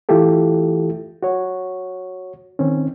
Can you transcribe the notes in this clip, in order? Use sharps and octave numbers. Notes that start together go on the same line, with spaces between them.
E3 A3 E4 F4 G4 A4
F#4 C#5
D#3 C4 C#4